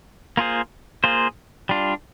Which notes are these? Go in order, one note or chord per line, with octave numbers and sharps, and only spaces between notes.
A#3 F4 G#4 C5
A#3 F4 G#4 C5
G3 D4 F4